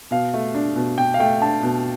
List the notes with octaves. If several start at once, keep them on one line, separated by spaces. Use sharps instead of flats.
B2 F5
A3
D4
B2
B2 G5
F5
A3 G5
D4 A5
B2